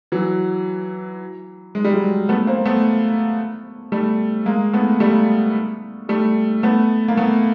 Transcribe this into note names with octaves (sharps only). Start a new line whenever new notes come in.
E3 F#3
G#3
G3
F#3 G#3
A3 B3
A#3 C4
A3 B3
G3 A3
G#3 A#3
A3 B3
G3 A3
G3 A3
A3 B3
A#3
A3 B3